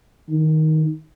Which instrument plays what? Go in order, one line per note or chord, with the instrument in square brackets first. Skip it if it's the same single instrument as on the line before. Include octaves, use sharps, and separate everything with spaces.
[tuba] D#3